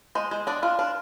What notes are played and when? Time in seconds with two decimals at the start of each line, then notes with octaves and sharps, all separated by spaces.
0.15 G#3 C5
0.31 G#3 C5
0.47 D4 D5
0.63 D4 F4
0.79 D4 F4